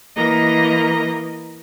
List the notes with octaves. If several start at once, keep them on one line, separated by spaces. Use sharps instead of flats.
E3 A#3 A#4 D#5 A#5